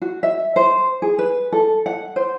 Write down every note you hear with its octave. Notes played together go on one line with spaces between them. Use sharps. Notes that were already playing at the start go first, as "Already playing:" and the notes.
F#4
E5
C5
G#4
B4
A4
F#5
C5